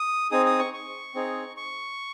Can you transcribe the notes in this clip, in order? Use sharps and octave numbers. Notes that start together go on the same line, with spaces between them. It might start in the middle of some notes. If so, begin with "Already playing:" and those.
Already playing: D#6
C4 D#4 G#4 D#6
D#6
C#6
C#6
C4 D#4 G#4
C#6